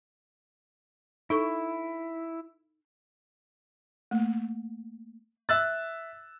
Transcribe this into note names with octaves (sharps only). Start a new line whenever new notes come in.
D#4 E4 A4 C#6
A3 A#3
E5 E6 F#6 A6